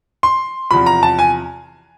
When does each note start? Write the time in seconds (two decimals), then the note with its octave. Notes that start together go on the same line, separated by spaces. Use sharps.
0.23 C6
0.71 E2 C3 F3 B5
0.86 A#5
1.03 A5
1.19 G#5